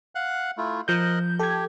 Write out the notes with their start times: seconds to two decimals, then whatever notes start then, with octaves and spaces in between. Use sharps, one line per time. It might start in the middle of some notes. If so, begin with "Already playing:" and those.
0.15 F5 F#5 F#6
0.58 A3 E4 F4
0.88 F3 A#4 D#5 F#6 G6
1.39 G4 A4 G#6